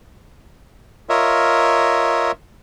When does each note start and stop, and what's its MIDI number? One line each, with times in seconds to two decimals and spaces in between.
1.09 2.32 65
1.09 2.32 70
1.09 2.32 73
1.09 2.32 75
1.09 2.32 76